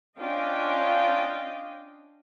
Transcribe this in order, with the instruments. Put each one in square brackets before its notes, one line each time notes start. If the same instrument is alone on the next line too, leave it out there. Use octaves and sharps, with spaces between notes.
[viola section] C#4 D4 F4 D#5 F5 G5